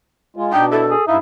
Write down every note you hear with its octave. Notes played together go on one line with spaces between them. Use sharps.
G#3 F4
B2 D4 D#4 G5
E4 A4
G#4
G2 D#4 E4 E5 F5